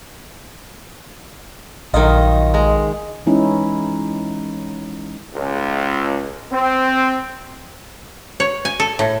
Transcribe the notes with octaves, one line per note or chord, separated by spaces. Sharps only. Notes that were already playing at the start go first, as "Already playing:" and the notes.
A#1 D#3 F#3 F4 D#5
G#3 A#5
E3 G#3 C#4 D#4 E4
C#2
C4
C#5
G#5
A4
A2